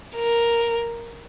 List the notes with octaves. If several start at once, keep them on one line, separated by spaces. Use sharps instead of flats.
A#4